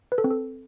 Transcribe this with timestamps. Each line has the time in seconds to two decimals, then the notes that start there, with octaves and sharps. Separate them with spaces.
0.12 B4
0.18 A4
0.24 C4
0.30 A4